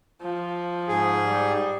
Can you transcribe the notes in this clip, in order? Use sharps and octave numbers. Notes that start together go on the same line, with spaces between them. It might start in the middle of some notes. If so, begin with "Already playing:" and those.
F3
G#2 G#4
G3